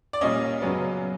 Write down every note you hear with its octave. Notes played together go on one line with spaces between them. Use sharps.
D5
A#2 G3 A#3 C#4 D#5
F#2 C#3 F#3 B3